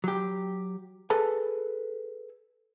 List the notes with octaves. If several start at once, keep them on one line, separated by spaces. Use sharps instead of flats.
F#3 G4
G#4 A4 B4 A5